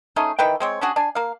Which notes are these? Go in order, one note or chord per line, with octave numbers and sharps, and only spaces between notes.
A3 C#4 D#4 G#4
D#3 E3 B4 G5
G#3 C4 C#5
C#4 D4 F#4 G#4
D4 G#5
A#3 F5